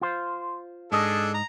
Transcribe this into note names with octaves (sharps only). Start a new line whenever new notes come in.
F4 C5
G#2 D4 G#4 A4 D#5
A#5